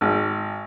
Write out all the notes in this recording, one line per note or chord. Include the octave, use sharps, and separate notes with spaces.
G#1